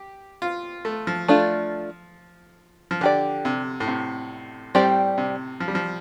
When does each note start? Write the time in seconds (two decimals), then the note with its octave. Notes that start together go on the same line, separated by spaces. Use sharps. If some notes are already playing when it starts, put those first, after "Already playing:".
Already playing: G4
0.42 F4
0.85 A3
1.07 F3
1.28 A3 D4 F4
2.91 F3
3.01 D3 D4 G4 D5
3.45 C3
3.80 A2
3.88 C3
4.75 A2 G3 C4 G4 D5
5.18 C3
5.60 F3
5.68 G3
5.75 F3